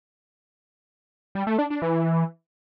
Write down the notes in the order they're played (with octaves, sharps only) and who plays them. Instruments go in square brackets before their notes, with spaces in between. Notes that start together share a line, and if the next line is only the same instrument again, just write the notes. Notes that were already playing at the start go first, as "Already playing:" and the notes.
[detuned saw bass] G3
A3
D4
D4
E3